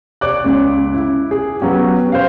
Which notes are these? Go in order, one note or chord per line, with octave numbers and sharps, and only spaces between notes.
C#5 D5 D6 F#6
C#2 C#3
E4
G#4
F#3 B3 C#4 G4
C5 F5